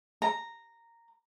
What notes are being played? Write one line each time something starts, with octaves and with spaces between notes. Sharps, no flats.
A#5